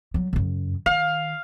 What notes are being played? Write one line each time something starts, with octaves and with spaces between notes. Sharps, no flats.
F#3 G3
F#2 C#3
D#3 F5